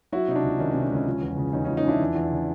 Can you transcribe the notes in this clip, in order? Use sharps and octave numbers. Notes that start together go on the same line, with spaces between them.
F#3 E4 F#4
C3 D#4
D4
C#2
D#3 C#4 D#4
C3 C#4
D4
C#2 C#4
F3
E2
C#3
E2 C#4 D#4
C#4 D#4
F3
C#4 D#4
F3 D4 E4
E2
E2
C#3